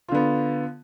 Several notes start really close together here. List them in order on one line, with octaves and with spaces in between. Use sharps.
F4 D3 B3